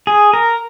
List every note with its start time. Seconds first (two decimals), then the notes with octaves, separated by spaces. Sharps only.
0.07 G#4
0.33 A#4